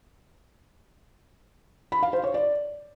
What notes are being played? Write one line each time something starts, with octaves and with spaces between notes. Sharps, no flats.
B5
F5
C5
C#5
D5